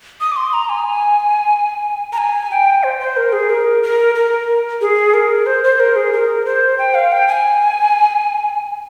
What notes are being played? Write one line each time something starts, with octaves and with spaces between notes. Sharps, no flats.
D#6
D6
C6
A#5
G#5
A#5
G#5
G5
C5
C5
A#4
G#4
A#4
A#4
A#4
G#4
A#4
C5
C5
A#4
G#4
A#4
C5
G5
F5
G5
G#5